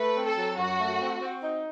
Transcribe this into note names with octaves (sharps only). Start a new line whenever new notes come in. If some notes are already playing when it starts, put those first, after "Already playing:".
Already playing: A3 B4
C4
A4
F#3
F#2 F#4
A3
C4
C4
D#4